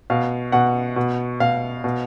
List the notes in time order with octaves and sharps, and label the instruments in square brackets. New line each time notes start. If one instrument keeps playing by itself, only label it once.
[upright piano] B2 F5
B2 F#5
B2
B2 F5
B2